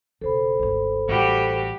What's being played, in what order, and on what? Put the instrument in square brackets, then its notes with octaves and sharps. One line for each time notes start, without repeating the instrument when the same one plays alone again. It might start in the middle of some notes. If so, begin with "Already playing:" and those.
[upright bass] E1 C#3 [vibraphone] A4 C5 B5
[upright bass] G#1 D2
[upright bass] A1 [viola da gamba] G3 F#4 G4